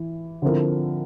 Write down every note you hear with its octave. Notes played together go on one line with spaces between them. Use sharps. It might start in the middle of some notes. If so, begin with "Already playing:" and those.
Already playing: E3
D3 F3 C4 E4 A#4